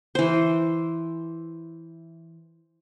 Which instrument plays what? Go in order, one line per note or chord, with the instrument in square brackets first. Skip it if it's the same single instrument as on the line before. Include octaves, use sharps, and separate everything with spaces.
[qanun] E3 C5